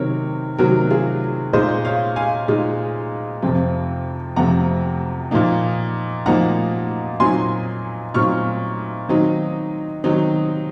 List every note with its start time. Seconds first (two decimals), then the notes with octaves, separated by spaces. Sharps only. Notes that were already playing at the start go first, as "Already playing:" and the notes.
Already playing: C3 D#3 F#3 C4 A#4 C#5
0.58 C3 D#3 F#3 C4 F#4 A#4
0.90 F4 G#4
1.53 A#2 G#3 D#4 C5 D#5
1.85 C#5 F5
2.16 F5 G#5
2.48 A#2 G#3 D#4
3.42 F2 C3 F3 C4
4.36 F2 C3 F3 C4 F#5 A#5
5.31 A#2 F3 A#3 D#4
6.26 A#2 F3 A#3 D#4 F#5 A#5
7.20 A#2 F#3 C4 D#4 G#5 C6
8.14 A#2 F#3 C4 D#4 C#6 F6
9.09 D#3 F#3 C4 D#4
10.04 D#3 F#3 C4 D#4